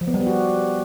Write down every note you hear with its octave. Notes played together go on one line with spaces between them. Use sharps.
F3
B3
G3
B3
F#4